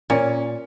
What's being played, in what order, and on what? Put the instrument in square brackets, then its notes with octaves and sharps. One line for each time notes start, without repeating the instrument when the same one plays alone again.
[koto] A#2 [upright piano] C#4